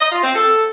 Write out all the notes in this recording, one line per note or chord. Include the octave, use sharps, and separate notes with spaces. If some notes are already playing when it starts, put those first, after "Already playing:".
D#5
F4
C4
A4